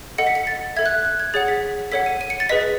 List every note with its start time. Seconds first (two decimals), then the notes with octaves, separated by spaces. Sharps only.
0.18 A4 D#5 F#5 C#7
0.27 B6
0.35 C#7
0.47 A6
0.76 A4 E5 G#6
0.86 F#6
1.05 F#6
1.20 G#6
1.34 G#4 C#5 F#5 A6
1.48 B6
1.92 A4 C#5 F#5 B6
2.06 D#7
2.21 D#7
2.30 C#7
2.40 A6
2.49 G#4 B4 D#5 B6